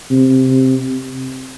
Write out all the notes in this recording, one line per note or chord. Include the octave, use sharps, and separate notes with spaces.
C3